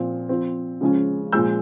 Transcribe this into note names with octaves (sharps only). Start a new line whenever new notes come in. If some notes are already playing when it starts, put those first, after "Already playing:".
Already playing: A#2 F3 C4
F3 C4
C#3 F3 G#3 C#4
A#2 F3 G#3 E6 G6